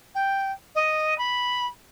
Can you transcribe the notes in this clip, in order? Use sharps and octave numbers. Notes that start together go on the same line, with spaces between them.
G5
D#5
B5